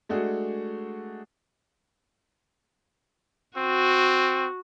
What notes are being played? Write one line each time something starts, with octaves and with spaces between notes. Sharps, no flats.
G#3 A3 D4 F#4 G#4
C4 F#4